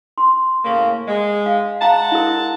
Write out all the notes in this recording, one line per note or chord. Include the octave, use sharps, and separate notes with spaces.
C6
A2 C#3 A#3
G#3
F5
G#3 F5 F#5 A5 A#5
E4 A#4